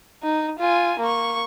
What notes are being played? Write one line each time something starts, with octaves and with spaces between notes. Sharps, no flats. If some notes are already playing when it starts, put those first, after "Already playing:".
D#4
F4 G#5
A#3 C#6